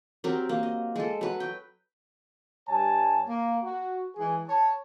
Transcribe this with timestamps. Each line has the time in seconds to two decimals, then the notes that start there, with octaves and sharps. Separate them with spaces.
0.24 F#3 C4 G4 A#4
0.49 A#3
0.63 D#5
0.96 G#3 A4
1.21 F#3 B4
1.40 G5
2.68 G2 G3 C#5 G#5 A5
3.27 A#3
3.63 F#4
4.16 E3 G#3 G#4
4.47 C#5 A5